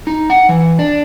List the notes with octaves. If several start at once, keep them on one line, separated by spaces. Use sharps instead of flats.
D#4
F#5
E3
D4